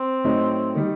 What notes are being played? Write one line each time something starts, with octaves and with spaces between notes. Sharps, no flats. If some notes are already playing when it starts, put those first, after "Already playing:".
Already playing: C4
A2 F#3 A3 D#4
D#3 G3